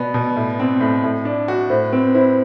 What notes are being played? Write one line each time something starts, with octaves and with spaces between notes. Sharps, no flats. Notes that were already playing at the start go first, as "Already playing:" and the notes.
Already playing: B2 B3 D5
B2
A2
C4
A2
A2
D4
F#4
A2 C5
C4 B4
E4 C5